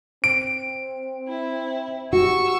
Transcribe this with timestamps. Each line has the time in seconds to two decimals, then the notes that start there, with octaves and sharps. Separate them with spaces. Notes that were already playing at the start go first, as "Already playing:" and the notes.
0.24 C4 D7
1.28 E4
2.13 F#4 G4 C#6 E6